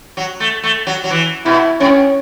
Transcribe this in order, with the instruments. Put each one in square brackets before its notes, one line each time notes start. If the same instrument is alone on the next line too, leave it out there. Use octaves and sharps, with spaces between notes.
[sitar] F#3
A3
A3
F#3
F#3
E3
[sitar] B2 [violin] E4
[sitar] A2 [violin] C#4